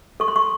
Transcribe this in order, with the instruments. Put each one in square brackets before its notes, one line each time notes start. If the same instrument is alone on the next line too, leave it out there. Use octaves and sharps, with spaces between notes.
[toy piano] A4 C#6
C6
C#6